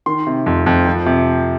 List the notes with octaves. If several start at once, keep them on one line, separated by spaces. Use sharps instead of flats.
D#3 C6
C3
F2
F2
F3
C3